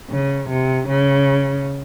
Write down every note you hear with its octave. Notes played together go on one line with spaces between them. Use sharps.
C#3
C3
C#3